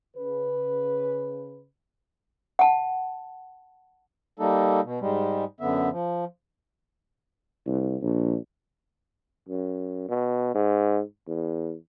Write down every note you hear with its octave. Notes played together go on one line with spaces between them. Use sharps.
C#3 B4
F#5 A5
G3 A#3 D#4 A4
B2
G#2 G3 G#3
F#2 D3 B3 E5
F3
C2
A#1
F#2
B2
G#2
E2